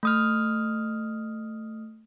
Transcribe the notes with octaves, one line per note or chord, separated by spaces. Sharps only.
A3 D#6 F6